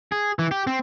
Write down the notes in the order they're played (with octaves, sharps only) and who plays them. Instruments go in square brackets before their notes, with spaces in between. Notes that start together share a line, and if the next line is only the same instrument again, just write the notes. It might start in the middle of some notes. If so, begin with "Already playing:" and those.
[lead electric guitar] G#4
E3
G4
C4